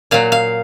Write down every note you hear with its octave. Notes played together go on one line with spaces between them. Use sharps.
A#2 F#3 F5
F5